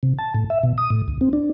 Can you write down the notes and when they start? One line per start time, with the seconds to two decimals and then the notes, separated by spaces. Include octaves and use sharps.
0.03 C3
0.19 A5
0.35 A2
0.50 E5
0.63 B2
0.78 D#6
0.90 A2
1.08 D2
1.21 C4
1.33 D4